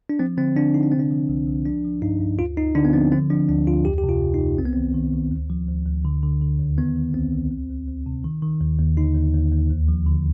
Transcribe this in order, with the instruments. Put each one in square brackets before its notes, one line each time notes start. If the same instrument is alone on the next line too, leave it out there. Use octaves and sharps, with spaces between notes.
[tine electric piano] D4
F3 C4
D3 C4
D3 D4
D3 D#4
D4
C3 C4
D4
F3
C2
C2
F3 D4
F3
G2 D#4
G2
D2 F4
D2 D#4
D3 D4
B3
F3 C4
D3 C4
F3 D4
D2 D4
D2 F4
F2 G4
G4
C3
F4
F2
D#4
F2
C2 C4
B3
D#3 C4
D#3
D#3
D2
F3
D2
D2
D3
D3
D3
D#2
D#3 B3
D#3
C2 C4
C2
D2
D2
D2
C3
D#3
D#3
D#2
D#2
D3 D#4
D#2
D#2
D#2
D2
F3
D3